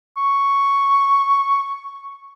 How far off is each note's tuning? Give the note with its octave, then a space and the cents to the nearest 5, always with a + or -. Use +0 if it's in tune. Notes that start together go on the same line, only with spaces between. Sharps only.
C#6 +0